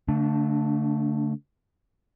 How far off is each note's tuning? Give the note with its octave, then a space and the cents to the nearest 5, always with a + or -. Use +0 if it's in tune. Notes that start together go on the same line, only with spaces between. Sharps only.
D3 -35 A3 +10 D4 +0